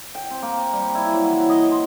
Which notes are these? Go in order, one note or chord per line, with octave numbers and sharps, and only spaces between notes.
G5
C4
A#3
G3
E4
F#3
E3
D#5
C6